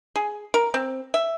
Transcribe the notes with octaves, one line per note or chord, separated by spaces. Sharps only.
G#4
A#4
C4
E5